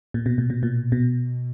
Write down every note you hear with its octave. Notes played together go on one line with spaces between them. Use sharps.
A#2
B2
A#2
B2
A#2
B2